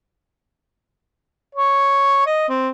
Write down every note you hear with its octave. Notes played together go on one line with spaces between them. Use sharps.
C#5
D#5
C4